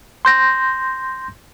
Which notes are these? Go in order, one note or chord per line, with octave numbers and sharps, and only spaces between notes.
C6 G6 A#6